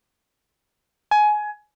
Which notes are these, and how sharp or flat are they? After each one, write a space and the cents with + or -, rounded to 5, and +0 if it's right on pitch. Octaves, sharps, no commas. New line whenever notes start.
G#5 +20